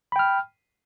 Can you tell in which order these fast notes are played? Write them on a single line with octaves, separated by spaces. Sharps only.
B5 G5 F6